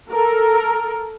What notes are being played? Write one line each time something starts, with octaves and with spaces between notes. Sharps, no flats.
A4 A#4